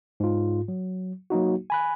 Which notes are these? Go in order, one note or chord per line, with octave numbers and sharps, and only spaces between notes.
G#2 F4
F#3
F#3 A#3 D#4 F#4
G#5 B5 F#6